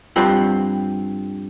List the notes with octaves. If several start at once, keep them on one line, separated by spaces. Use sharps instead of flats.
G2 F3 C4 F#5